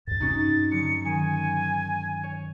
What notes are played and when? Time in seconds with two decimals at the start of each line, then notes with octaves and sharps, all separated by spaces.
0.07 E2 G2 A6
0.20 G2 C3 C#4 D#4 F#4
0.71 D3 F#3 G#3 C#7
1.05 D#3 G#5
2.23 C#5